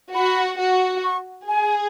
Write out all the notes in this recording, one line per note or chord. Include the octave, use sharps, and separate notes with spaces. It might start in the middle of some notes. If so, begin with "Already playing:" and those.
F#4 B5
F#4
C#6
G#4 G#5